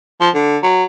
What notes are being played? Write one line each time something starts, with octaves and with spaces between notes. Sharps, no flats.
F3
D3
F#3